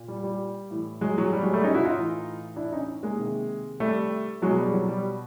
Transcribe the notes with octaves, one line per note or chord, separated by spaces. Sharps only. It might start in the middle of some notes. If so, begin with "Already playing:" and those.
Already playing: A#2
G3
G3
A2 E3
F#3 G#3
F#3 G#3
G3
F#3 G#3
G3 A3
C#4 D#4
E4 F#4
D#4 F4
A2 E3
D4 E4
C#4 D#4
G#3 A#3
C3 D#3
G3 A3
B2 F#3 G#3
G3
F#3
G3